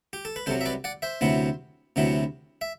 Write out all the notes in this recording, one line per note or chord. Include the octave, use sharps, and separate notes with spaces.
G4
A4
B4
C2 C3 F#3 A4 C5
E5
B4 D5
D5 F#5
C5 E5
D2 C3 F#3 B3 E4
D2 C3 F#3 B3 E4
E5